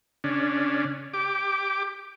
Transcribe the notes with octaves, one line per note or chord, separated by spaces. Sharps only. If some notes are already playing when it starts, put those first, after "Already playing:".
C#3 C#4 D4
G4 D6